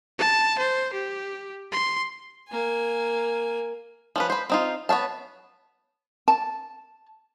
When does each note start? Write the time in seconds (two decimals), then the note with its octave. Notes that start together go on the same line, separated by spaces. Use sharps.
0.18 A5
0.58 C5
0.93 G4
1.72 C6
2.49 A#3 G#5
4.16 F3 C#4 B4
4.30 B4 C5
4.50 C4 D#4 F4
4.89 B3 C#5 F5 A5
6.28 A5